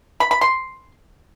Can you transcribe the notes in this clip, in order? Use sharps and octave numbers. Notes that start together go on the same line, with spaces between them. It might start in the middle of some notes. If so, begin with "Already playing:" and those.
B5
B5
C6